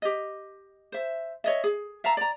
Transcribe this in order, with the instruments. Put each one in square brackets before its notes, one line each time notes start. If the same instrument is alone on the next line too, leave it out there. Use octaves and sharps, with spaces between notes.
[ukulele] G4 D#5
C5 E5
C#5 D#5 E5
G#4
E5 F5 A5 A#5
D5 A#5